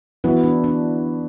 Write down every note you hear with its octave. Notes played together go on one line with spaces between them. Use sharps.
E3 B3 E4 F#4
D4
D4